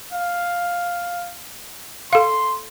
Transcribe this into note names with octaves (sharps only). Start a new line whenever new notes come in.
F5
A4 F5 C6